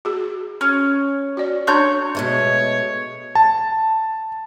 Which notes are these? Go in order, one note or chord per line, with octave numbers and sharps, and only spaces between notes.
F#4 G#4
C#4
F#4 D5
D4 C#5 A5 C6 G6
B2 G#3 A3 C#5
A5